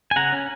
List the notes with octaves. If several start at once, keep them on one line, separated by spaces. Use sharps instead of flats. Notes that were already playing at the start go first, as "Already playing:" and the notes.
G#5
C#3 F#5 A#5
C#4